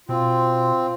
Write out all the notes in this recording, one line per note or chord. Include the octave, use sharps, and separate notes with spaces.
B2 C4 F4